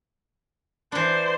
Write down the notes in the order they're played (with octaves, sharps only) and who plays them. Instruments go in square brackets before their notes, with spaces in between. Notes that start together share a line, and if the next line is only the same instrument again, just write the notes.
[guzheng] E3 D4 [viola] C5